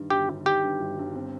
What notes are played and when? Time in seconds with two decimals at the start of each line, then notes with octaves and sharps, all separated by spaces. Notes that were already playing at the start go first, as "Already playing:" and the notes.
Already playing: G2 D#3
0.10 G1 G4
0.28 G1
0.45 D#3 G4
0.63 G2
0.80 G1
0.99 G1
1.15 C4